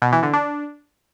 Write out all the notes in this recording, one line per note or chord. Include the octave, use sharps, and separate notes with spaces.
B2
E3
D3
D4